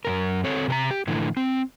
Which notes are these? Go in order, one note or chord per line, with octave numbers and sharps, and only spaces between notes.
F#2 A#2 A#4
C4 A4 C#5
C3 A#4 A#5
G4
A2 D3 E3 F3
C4